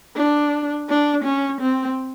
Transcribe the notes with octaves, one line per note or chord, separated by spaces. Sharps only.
D4
D4
C#4
C4